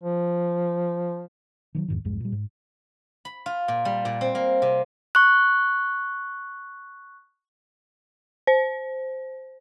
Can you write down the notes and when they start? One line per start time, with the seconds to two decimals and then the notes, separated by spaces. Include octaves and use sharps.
0.03 F3
1.75 D#3 F3 F#3
1.88 E2 G#2 D#3
2.04 B1 F2 G#2 G#3
2.20 A#2 G3
2.32 G#2
3.25 B5
3.46 F4
3.68 A#2
3.85 G3
4.05 A#2
4.21 C4
4.35 A#3
4.62 C3
5.15 C#6 F#6
8.47 C5